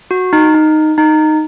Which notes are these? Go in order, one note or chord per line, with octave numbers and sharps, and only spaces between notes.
F#4
D#4
D#4
D#4